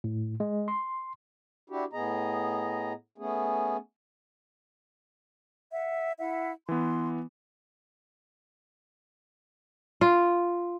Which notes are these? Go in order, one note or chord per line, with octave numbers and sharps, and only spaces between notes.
A2
G#3
C6
D4 E4 F#4 G4
A2 B3 G#4 D#5 A#5
A3 B3 C#4 G#4
E5 F#5
E4 E5 F#5
E3 B3 C6
F4